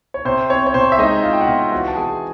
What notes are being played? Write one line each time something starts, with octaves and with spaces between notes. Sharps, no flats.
C#5
C3 C5
C4 C#5
C#5
C3 C5
E5
G#3 D#4 D#5
C3 F4 F5
G5
F#5
C3 F4 F5
E3 F#4 F#5
A5
E3 G#4 G#5